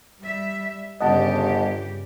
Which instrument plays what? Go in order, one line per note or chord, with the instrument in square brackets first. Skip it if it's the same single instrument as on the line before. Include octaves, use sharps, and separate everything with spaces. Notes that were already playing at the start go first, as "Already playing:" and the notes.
[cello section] G3 E5
[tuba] G1 [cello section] G2 C#3 G4 [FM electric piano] D#5 F#5 A5